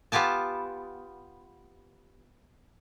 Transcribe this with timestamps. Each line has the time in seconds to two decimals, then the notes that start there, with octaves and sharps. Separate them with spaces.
0.12 B3 F4 G4 G#5 A5